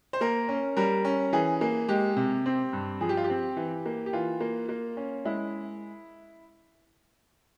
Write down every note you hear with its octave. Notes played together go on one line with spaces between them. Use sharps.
C5
A#3 A#4
C#4
G3 A#4
C#4
E3 G#4
A#3
G#3 G4
C3
C4
G2
F3 G#4
G4
F4
G4
C4
E3
A#3
G4
E3 F4
A#3
A#3
C#4
G#3 E4